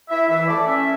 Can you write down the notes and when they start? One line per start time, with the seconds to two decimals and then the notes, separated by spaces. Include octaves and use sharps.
0.09 E4 E5
0.29 E3 E5
0.47 A3 D5
0.66 C#4 E5